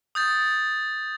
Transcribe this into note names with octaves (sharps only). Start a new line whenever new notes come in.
D#6 G6 A6